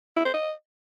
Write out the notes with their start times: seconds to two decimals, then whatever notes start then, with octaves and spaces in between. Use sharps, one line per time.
0.17 E4
0.25 C5
0.34 D#5